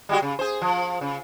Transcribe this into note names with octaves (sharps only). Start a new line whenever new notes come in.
G3 G#3 F#4
C#3
G#4 C5
F3
C#3